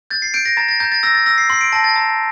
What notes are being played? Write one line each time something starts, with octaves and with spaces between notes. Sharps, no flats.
G6 A6
C7
G6 D7
A#6
A#5 A6
A6
A#5 G6
A6
E6 A#6
A6
E6 A#6
C7
C6 C7
D7
A5 A#6
A6
A#5